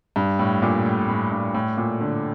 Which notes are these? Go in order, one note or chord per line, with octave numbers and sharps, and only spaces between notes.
G2
A2
A#2
A2
A2
G2
A2
A#2
D3